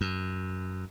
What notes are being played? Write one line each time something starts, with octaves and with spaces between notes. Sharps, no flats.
F#2